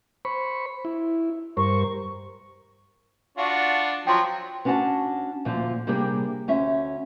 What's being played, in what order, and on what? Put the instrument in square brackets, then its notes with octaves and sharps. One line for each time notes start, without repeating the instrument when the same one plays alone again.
[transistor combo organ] C5 B5 C#6
E4
[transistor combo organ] G2 A#4 C5 [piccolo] C#6
[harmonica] D4 F4 F#4
[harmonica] F3 F#3 [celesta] G5 C6
[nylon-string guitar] B3 C#4 D4 F#4 F#5 A5
D2 A#2 F3
C3 G3 A#3 D4 G4 G#4
D2 C#4 E5